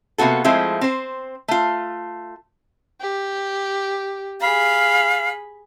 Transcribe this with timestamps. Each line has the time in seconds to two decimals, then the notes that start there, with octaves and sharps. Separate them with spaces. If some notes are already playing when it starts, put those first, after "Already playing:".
0.18 C3 A#3 B3 F#4 A4
0.44 F3 G#3 A3 C4 E4
0.81 C4 C5
1.48 A3 F4
3.01 G4
4.41 G#4 F5 B5